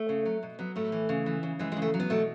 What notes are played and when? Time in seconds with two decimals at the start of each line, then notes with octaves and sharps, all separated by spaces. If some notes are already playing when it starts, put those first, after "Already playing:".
Already playing: A3
0.09 C#3
0.26 F#3
0.43 B2
0.59 F#3 B3
0.76 A2 A3
0.92 E3
1.09 C#3
1.26 E3
1.43 C#3
1.59 E3 G#3
1.72 G#3
1.77 C#3
1.82 A3
1.94 F#3
2.00 B3
2.10 B2 A3